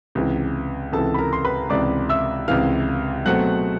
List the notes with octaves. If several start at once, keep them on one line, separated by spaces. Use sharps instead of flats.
C#2 C3 E3
C#2 C3 E3 A4 A5
B5
A#4 A#5
C6
B4 B5
C#2 C3 E3 D5 D6
E5 E6
C#2 C3 E3 F5 F6
B2 F#3 A3 C4 F#5 F#6